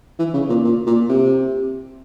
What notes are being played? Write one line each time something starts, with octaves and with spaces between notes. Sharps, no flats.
E3
C#3
A#2
A#2
A#2
C3